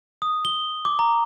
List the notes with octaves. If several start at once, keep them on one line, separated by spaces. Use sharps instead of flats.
D#6
G7
D6
A#5